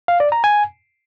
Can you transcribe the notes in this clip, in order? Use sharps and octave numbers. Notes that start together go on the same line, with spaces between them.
F5
D5
A#5
G#5